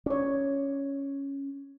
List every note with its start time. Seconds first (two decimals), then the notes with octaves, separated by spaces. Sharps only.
0.06 C#4 C#5 D5